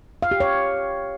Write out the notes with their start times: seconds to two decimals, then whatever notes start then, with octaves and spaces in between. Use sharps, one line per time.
0.22 F5
0.31 G4
0.40 C#5